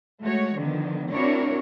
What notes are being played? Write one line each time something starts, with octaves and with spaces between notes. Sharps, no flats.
G#3 A3 F#4 C#5
D3 D#3 F3 B3
C4 D4 E4 F#4 A#4 C#5